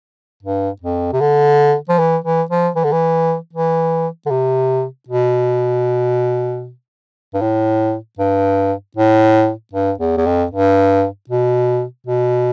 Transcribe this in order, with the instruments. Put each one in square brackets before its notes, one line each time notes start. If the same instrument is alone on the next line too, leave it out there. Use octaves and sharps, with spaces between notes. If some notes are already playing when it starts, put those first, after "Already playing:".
[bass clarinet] G2
F2
C3
D3
F3
E3
E3
F3
E3
D3
E3
E3
D3
C3
B2
G2
A2
G2
A2
G2
E2
E2
F2
G2
B2
B2